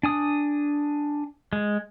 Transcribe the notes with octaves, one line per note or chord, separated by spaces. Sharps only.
D4 G#5 D#6
G#3